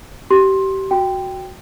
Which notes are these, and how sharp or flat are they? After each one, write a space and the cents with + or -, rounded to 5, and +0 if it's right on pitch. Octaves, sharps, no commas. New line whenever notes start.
G4 -25 C6 +15
F#4 +0 G5 +0 C6 -20